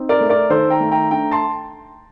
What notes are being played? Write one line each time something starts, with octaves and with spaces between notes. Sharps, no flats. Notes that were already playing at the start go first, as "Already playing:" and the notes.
Already playing: C4 D#4
A#4 D5
A3
A#4 D5
D#3 A4 C5
G5 A#5
A3
G5 A#5
D4 G5 A#5
A5 C6